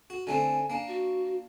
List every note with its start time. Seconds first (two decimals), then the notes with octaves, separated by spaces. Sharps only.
0.10 F#4
0.27 D3 A3 C4 G#5
0.70 A#3 D4
0.88 F#4